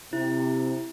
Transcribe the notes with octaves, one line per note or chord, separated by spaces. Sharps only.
C3 E4